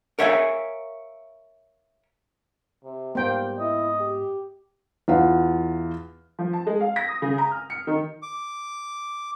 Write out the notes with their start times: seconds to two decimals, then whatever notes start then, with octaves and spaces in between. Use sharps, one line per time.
0.19 A#4 C#5 E5 F5 G5 G#5
2.84 C3
3.15 G#2 G3 A#3 B3 C5 G5
3.59 E4 D#5
4.00 G4
5.08 E2 F4 F5 F#5
6.39 F3
6.53 A5
6.67 G#3
6.81 F5
6.96 A#6
7.08 D#6
7.22 C#3
7.38 A#5
7.51 F6
7.70 C#7
7.87 D#3
8.22 D6